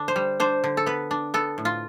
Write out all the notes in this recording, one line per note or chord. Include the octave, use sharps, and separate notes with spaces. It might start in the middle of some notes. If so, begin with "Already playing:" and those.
Already playing: D3 D4
C5
G3
D4 C5
D3
A4
B3 B4
D4
B3 A4
A2
F4